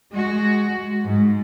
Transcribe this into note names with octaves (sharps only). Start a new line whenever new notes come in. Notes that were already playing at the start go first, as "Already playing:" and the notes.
G#3 F#4
G#2